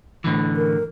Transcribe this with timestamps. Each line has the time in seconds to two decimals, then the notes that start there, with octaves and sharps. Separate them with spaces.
0.24 A2 D3 E3
0.57 A#4